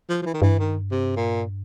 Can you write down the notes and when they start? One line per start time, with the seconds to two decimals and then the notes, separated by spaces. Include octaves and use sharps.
0.09 F3
0.22 F3
0.26 E3
0.34 D#3
0.42 G2 E3
0.59 D#3
0.91 C3
1.16 A#2